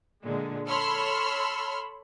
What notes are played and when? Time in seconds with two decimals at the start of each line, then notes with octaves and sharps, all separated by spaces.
0.24 A#2 D3 G#3
0.68 A4 C#5 B5 C6 E6 F6